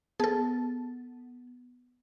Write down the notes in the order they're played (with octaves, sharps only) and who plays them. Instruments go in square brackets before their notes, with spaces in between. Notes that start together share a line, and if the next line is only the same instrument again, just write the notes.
[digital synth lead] B3 [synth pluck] G#4 A4 [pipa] A5